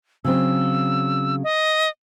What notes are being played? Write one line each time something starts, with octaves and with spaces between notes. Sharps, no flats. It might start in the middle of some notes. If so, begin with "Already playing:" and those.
C#3 F#3 C4 E6
D#5